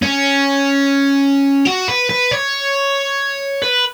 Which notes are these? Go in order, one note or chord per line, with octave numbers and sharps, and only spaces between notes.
C#4
F#4
B4
B4
C#5
B4